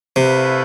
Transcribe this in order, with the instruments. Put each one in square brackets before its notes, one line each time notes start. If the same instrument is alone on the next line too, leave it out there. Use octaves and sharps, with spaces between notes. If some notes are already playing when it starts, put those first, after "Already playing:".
[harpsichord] C3 [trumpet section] A3 E4 B4 F5